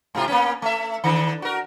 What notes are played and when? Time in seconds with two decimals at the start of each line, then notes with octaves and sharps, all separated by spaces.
0.15 G#2 C3 F4
0.28 A#3 B3 C#4
0.62 A3 E5
1.04 D3 D#3
1.42 F#4 A#4